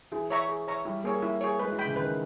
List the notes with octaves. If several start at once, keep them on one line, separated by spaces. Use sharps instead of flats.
E3 G#4
C#5 E5 A#5 C#6
G#4
C#5 E5 A#5 C#6
G3 E4
A#3 G#4 C#5
E4
G#4 C#5
G#3 B4
E3
G5 B5
C#3
D#3 B4